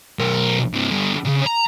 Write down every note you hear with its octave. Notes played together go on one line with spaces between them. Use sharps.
B1 A#4
G2 C3
G2 D3
A#2 C#3
A#5